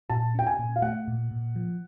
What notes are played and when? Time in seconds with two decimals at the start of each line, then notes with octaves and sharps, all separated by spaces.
0.10 A#2 A5
0.35 C#4 G5
0.47 G#5
0.59 A#2
0.76 F5
0.82 A3 F#5
1.08 A#2
1.31 A#2
1.56 F3